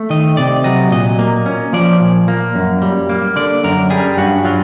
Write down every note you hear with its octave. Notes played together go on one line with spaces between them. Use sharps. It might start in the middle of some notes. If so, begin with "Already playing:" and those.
Already playing: A3
D#3 D#5
C3 D5
F#3 D#5
A#2 D#5
A#3
C#4
F3 D5
A#2
A#3
F#2
G3
A#3
D3 D5
F#2 A#4
G3 G#4
G2 F#4
F#3 F4